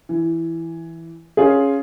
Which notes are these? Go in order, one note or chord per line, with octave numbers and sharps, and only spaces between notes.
E3
C#4 F4 G#4